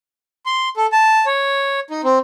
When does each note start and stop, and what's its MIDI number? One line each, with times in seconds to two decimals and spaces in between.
0.46 0.69 84
0.77 0.86 69
0.92 1.25 81
1.26 1.80 73
1.90 2.01 63
2.04 2.19 60